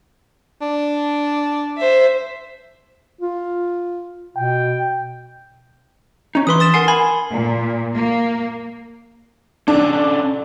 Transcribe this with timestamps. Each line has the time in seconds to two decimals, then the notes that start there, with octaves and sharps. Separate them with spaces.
0.61 D4
1.77 C5 E5
3.21 F4
4.37 B2 G5
6.35 C#4 D#4
6.47 E3 B4 C6 D#6
6.60 D#6 A6 E7
6.74 A#4 F#5 G#5 C6
6.88 G#5 B5
7.32 A#2
7.95 A#3
9.68 C#4 D4 A4 D5